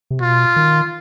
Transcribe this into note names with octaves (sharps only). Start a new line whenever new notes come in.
C3
B2 F4
D#3